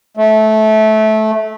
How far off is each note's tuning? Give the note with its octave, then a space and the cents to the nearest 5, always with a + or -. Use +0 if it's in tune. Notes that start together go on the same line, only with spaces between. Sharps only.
A3 -20